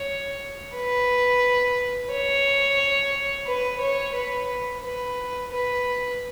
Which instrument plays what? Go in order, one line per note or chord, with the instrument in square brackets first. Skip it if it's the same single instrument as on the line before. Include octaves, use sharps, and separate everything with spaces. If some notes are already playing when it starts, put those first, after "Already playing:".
Already playing: [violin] C#5
B4
C#5
B4
C#5
B4
B4
B4